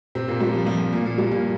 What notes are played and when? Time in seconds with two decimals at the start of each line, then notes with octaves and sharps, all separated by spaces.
0.15 C3 C4
0.28 A#2 A#3
0.41 G2 G3
0.53 F3
0.66 F3
0.80 F3
0.92 A#2 A#3
1.05 A#2 A#3
1.18 G2 G3
1.31 A#2 A#3